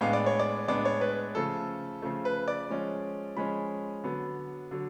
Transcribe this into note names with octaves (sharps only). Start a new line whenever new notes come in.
A2 G#3 B3 D4 F5
D5
C#5
D5
A2 G#3 B3 D4 D5
C#5
B4
C#3 F3 A3 A4
C#3 F3 A3
B4
D5
F3 G#3 C#4
F3 G#3 C#4 B5
D3 F#3 B3
D3 F#3